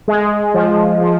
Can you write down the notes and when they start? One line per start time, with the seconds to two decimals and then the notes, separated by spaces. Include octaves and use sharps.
0.08 G#3
0.54 F3
1.01 F3